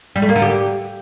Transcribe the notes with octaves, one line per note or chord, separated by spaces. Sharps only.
G3
A3
A#3
D3
G4